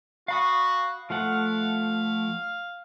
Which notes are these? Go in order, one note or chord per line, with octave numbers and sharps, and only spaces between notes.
F#4 F5 B5 D#6
F3 A3 F5 F#5